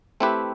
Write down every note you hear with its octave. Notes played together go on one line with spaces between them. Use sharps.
A3 C4 E4 G4 B4